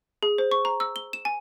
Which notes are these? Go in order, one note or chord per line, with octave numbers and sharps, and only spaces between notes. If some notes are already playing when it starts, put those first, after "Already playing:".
G#4
C5
C#6
A#5
E6
G7
E7
G#5